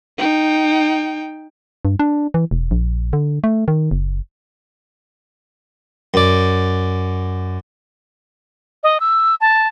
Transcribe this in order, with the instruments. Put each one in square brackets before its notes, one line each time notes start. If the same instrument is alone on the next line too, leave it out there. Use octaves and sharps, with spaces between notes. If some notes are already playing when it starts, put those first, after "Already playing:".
[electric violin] D#4 G5
[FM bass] G2
D4
E3
E1
A#1
D3
A3
D#3
F#1
[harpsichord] F#2 D5
[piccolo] D#5
E6
A5